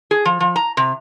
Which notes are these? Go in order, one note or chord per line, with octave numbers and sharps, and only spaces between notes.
G#4
F3
F3
A#5
C3